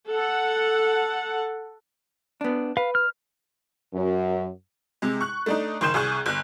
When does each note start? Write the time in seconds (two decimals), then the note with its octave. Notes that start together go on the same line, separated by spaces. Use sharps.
0.10 A4 F#5
2.41 B3 D4
2.77 B4 F5
2.95 F6
3.94 F#2
5.02 C3 G#3
5.21 C#6 F#6
5.46 A3 D4 D#4
5.81 F#1 D#3 C6 G6 E7
5.94 C2 G#4 C#6 F#6
6.26 G1 F#6